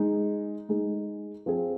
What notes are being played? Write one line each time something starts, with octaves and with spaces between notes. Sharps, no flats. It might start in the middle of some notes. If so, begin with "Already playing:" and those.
Already playing: G#3 D#4 G#4
G#3 D#4 G#4
F3 C4 G#4